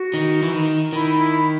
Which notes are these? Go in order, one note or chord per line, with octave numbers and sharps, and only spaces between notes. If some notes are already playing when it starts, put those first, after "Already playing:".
Already playing: F#4
D#3
E3
D#3
D#3 E4
E4